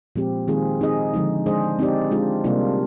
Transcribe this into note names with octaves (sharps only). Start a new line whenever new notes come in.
A#2 F3 G#3 C4 G4
D#3 G#3 C4 F4 G#4
C4 D#4 G#4 D#5
D3 F3 G#3 D#4
G#3 D4 G#4 C5 D#5
C4 D#4 G4 D5
G#3 D4 F4
C3 G3 A#3 D4 F4